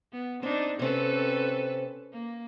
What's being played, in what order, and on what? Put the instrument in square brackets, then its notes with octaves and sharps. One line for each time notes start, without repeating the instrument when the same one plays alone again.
[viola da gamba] B3
[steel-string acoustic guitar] C4 [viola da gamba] D4 D#4
[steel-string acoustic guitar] C3 C4 [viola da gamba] C#4 A4 B4
[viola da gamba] A#3